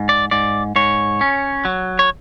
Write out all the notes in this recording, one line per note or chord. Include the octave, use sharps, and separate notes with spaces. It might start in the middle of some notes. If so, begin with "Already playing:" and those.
Already playing: G#2
D5
G#2 D5
G#2 C#5
C#4
F#3
C#5